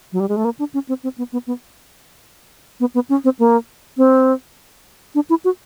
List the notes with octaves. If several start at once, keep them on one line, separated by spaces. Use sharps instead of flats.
F#3
G3
G#3
A3
A#3
D4
C#4
C4
C4
B3
B3
B3
B3
B3
C#4
C4
A#3
C4
D4
E4
F#4